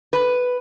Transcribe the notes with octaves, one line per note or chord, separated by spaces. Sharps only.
B4